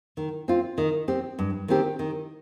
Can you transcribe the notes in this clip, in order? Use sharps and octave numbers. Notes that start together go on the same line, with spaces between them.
D#3
C4 F4
D#3
C4 G4
G2
D#3 C4 G4
D#3